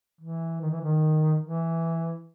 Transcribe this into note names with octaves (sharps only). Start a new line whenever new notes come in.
E3
D#3
E3
D#3
E3